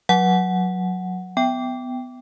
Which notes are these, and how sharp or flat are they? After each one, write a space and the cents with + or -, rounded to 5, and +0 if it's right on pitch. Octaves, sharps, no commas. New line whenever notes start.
F#3 -15 F#5 +0
B3 +20 G5 +0